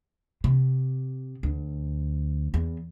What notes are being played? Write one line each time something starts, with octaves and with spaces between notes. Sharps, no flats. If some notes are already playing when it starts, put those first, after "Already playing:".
C3
D2
E2